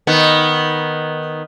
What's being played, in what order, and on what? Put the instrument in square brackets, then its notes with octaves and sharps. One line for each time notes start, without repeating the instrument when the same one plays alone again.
[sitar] D#3 B3